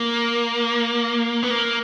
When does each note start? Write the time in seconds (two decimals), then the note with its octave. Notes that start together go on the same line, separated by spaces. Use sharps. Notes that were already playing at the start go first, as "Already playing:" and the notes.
Already playing: A#3
1.43 B3
1.51 A#3